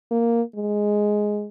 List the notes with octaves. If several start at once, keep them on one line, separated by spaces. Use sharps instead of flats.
A#3
G#3